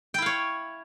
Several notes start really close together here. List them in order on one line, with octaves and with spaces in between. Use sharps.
G5 E4 F5 C#5